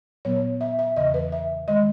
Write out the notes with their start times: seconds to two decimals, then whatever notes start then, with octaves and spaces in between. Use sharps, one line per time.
0.25 A#2 F#3 B3 C#5
0.61 E5
0.79 E5
0.97 E2 C#3 E3 D#5
1.14 B4
1.32 E5
1.68 D#3 G#3 D#5